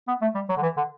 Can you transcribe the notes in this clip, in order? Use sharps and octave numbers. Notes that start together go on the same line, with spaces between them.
B3
A3
G3
F#3
D3
E3
D3